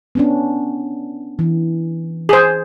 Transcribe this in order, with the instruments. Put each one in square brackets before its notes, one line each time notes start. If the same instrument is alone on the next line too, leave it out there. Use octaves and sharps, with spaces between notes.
[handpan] B3 C#4 D4
E3
[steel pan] G#4 C5